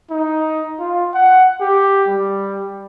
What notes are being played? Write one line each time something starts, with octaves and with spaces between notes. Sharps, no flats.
D#4
F4
F#5
G4
G3